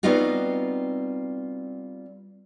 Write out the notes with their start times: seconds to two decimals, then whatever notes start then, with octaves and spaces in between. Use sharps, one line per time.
0.03 G3 B3 C4 D#4 F4 F#4